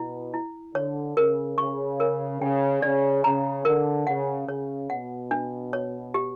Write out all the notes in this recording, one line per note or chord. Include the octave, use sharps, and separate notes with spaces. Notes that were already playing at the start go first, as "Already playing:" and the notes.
Already playing: B2 E4
E4
D3 C#5
C#3 A#4
C#3 C#6
A#4
C#3 G5
C#3 D5
C#3 A#5
D3 A#4
C#3 F#5
C#3 C#5
B2 F#5
D4
C#5
G4